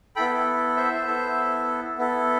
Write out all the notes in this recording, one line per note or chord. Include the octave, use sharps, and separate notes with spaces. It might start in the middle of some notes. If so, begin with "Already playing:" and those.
B3 E4 A4 G5 B5
C5 E5
B3 E4 A4
B3 E4 A4